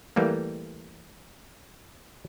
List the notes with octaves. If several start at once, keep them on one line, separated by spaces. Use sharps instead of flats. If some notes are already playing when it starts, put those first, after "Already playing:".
E3 G3 A3 A#3